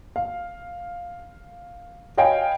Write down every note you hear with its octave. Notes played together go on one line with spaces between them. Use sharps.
F5
C#5 D#5 F5 G5 G#5 B5